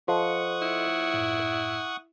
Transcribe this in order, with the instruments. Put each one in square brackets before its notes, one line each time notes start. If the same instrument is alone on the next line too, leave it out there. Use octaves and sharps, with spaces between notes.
[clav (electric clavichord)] F3 [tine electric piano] A4 D#5 C6 [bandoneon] F#5 C#6 D#6
[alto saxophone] E4
[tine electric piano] F#2 A2